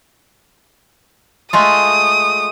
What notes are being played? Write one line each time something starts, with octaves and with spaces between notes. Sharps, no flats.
G#3 A3 F4 D#6